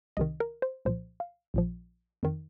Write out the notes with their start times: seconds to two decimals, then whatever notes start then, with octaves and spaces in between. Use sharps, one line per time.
0.17 C2 C3 D#3 D#5
0.40 A#4
0.62 C5
0.85 C2 A#2 F3 C5
1.20 F5
1.54 A#1 A#2 F3
2.23 F2 D#3